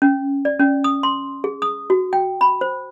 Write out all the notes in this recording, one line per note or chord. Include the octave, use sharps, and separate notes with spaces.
C#4
D5
C#4
D#6
C6
G#4
D#6
F#4
G5
B5
C5